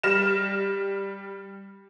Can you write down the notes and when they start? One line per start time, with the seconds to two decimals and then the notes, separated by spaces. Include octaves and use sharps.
0.03 G3 F6 A#6 E7